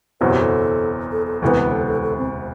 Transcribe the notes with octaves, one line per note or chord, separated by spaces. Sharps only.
F#1 E2 B2 F#3 C4 B4
G4
A4
A4
A4
E1 D2 C3 E3 B3 A4
B4
B4
A4
A4
A4
C4